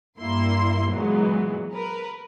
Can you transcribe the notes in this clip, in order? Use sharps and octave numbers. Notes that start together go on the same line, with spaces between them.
G2 G3 A#3 E4 C6
A#2 E3 F#3 G#3 B3
A#4 B4